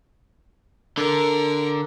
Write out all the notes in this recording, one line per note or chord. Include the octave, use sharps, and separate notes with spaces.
D3 A#4